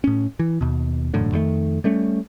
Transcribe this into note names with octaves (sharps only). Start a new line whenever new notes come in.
A2 C#4
E3
D#2 B2
E1 F#2 A2 D3
F2 D#3 G#3 A3
G3 A3 C#4